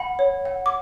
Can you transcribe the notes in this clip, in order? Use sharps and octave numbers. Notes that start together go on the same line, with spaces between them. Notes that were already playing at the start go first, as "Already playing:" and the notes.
Already playing: F#5 B5
C#5
F#5
D6